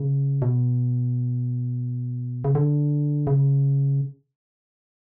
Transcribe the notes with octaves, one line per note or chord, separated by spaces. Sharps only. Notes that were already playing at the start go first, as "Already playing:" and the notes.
Already playing: C#3
B2
C#3
D3
C#3